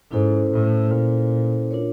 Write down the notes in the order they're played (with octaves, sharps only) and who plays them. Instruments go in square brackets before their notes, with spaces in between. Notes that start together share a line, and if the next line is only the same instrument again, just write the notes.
[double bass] G#2 [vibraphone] C#4 E4 A4 C5
[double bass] A2
A#2
[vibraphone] D4 F4 A#4 C#5